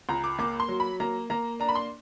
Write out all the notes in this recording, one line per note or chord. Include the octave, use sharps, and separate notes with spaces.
C#2 A#5
D6
A#3 D6
C6
F#3
B5
A#3 A#5
A#3 A#5
D4 A#5
B5
C6